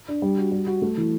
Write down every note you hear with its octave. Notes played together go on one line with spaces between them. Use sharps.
D4
G3
F#4
G3
F#4
A3
E3